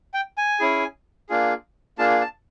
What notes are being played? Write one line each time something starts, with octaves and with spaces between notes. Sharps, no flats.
G5
G#5
C#4 E4 G#4
A#3 D4 F4 G#4
A#3 D4 F4 G#4 A5
A5